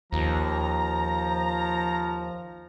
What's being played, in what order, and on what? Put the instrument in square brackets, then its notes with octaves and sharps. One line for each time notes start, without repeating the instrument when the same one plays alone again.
[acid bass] D#2 [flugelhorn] F3 [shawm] A#5